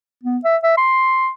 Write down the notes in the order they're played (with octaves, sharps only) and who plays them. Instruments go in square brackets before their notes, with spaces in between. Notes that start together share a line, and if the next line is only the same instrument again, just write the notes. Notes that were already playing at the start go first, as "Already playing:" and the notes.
[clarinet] B3
E5
E5
C6